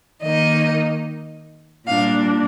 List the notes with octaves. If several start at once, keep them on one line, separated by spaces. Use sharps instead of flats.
D#3 A#3 D#4 D#5
A#2 G3 A#3 D4 F5